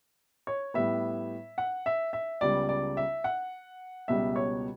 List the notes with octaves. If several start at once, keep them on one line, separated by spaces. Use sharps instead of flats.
C#5
A2 G3 B3 E5
F#5
E5
E5
C#2 C#3 G3 B3 D5
D5
E5
F#5
C#2 B2 G3 E5
C#5